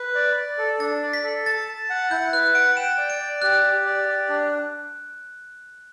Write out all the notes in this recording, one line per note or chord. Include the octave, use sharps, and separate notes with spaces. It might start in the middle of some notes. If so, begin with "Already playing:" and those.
Already playing: B4
D5
D5
A4
D4 A6
D5
B6
A4
A5 A6
A5
F#5
E4 G6
B4 F#6
F#5 D7
G5 E7
D5
D7
D5
G4 F#6
G4
D5
G4
D4